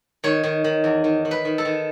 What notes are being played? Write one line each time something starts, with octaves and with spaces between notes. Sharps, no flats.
D#3 C#5
D#3
D#3
E2
D#3
D#3
B4
D#3
A4
D#3